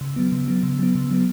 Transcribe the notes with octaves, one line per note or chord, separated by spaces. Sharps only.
C#3
F#3 B3
C#3
F#3 B3
C#3
F#3 B3
C#3
F#3 B3